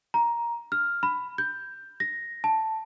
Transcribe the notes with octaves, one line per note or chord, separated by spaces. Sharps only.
A#5
F6
B5
G6
A#6
A5